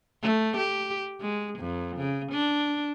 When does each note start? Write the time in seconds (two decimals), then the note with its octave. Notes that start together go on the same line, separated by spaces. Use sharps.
0.22 A3
0.57 G4
1.21 G#3
1.59 F2
1.97 C#3
2.32 D4